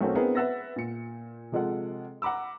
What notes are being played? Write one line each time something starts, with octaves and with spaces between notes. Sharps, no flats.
B1 A3 C4 C#4 F#4 A#4
B3 C4 D4 E4 G#4 A#4
B4 E5 F#5 E6 A6 A#6
A#2 C#7
C3 F3 G#3 F4 A4 F#5
F#5 A#5 B5 D6 E6